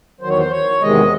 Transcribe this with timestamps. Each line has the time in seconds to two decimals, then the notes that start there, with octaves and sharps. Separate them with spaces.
0.21 E2 D#3 F#3 C5
0.29 C#5
0.37 C5
0.51 C#5
0.81 E2 C3 D#3 G#3 D#5